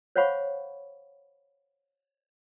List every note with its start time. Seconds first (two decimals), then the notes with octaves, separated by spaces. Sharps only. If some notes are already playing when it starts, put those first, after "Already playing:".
0.16 C5 C#5 F5 F#5 B5 C#6